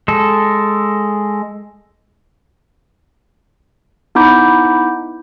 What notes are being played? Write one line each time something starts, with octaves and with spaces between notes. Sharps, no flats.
G#3 A4
B3 D#4 E4 B5 D6 G6